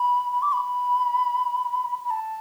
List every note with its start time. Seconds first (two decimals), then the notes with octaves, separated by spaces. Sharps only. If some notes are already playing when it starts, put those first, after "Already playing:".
Already playing: B5
0.32 B5
0.42 D6
0.54 B5
2.05 B5
2.11 A5